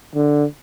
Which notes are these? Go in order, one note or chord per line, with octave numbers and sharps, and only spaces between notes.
D3